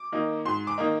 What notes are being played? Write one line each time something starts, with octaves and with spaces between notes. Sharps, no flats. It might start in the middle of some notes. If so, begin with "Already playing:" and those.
Already playing: D6
D#3 A#3 D#4
G#2 C6
D6
D#3 A#3 D#4